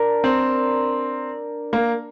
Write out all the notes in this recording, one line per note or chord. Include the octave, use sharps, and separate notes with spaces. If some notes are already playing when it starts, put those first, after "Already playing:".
Already playing: D4 A#4
C4
A#3